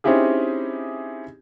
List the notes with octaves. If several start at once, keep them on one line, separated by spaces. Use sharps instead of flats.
C4 C#4 D#4 E4 G4 G#4